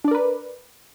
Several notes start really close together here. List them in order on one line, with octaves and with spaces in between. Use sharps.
D4 D5 A#4 B4